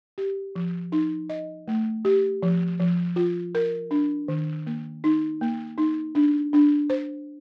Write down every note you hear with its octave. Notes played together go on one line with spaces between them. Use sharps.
G4
F3
D#4
D#5
A3
G4
F3
F3
F4
A#4
D4
D#3
A#3
D#4
A#3
D#4
D4
D4
C5